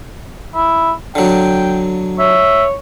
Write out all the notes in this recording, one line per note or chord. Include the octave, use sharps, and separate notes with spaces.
E4
D3 F#3 G5
C#5 E5